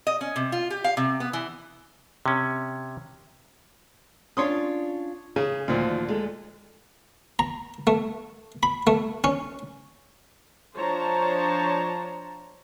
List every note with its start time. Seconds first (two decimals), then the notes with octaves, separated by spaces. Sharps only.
0.07 D#5
0.21 C#4
0.36 C3
0.52 F4
0.70 G4
0.84 F5
0.97 C3
1.20 B3
1.33 E3
2.26 C3 C#4
4.37 C#4 D4 F4 C#5 C6 D#6
5.36 C#3 G#4
5.68 D2 A#2 D#3 F3
6.08 G#3 A4
7.39 A#5
7.87 A3
8.63 B5
8.87 A3
9.24 C#4
10.75 F3 D4 C5 C#5 A5 A#5